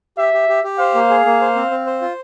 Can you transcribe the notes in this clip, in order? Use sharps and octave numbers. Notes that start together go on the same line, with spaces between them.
G4 E5
G4
G4
G4
C5 F5
A#3
G#4
A#3
C5
C4
C4
C5
F4